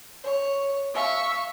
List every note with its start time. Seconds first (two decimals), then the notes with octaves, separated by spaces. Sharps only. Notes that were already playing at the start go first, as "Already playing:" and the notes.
0.23 C#5
0.94 E5 F5 C#6